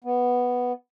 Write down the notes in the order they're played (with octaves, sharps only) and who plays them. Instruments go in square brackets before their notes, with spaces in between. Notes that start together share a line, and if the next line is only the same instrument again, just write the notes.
[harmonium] B3